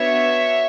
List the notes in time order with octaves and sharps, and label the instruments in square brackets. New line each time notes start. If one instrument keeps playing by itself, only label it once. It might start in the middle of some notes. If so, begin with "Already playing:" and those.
Already playing: [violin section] B3 D4 F#4 C#5 E5